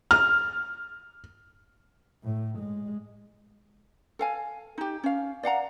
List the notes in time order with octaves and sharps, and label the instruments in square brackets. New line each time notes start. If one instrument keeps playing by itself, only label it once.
[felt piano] F6
[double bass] A2
G#3
[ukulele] A4 F5 G#5
D#4 G4
C#4 F5
D5 F5 F#5 A#5